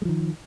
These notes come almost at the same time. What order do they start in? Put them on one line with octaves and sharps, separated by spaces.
G#3 F3 D#3